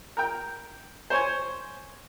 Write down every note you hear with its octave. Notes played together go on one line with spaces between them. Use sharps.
A#4 G5
C5 C#5 G#5